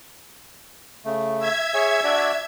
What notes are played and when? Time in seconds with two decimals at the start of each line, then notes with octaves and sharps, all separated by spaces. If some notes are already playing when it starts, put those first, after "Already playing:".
1.05 C#3 A3
1.39 E5 G#6
1.74 G#4 C#5 G#5
2.04 D4 F#4 D5